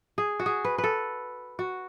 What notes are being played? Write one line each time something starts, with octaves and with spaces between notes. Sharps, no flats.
G#4
F#4
G#4
B4
B4
A4
F#4